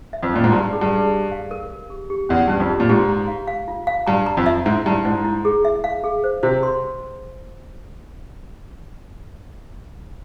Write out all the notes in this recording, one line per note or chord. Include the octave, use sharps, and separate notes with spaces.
E5
F2
A#2 C#4
G#2
G2 A#5
G#4
G2
G#4
G4
F5
A#4
A#4
G4
G4
E2 C#4
G2 C#4
F2
G4
A#2
G#2 G4
A#5
F5
F5
F4
F5
G2 A#5
A#5
F2
E5
G#2 E4
G2 E4
G#2 E4
E4
G#4
E5
F5
G#4
C5
C3 C5
C6